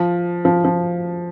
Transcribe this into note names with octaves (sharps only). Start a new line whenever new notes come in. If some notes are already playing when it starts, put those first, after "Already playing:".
Already playing: F3
F3
F3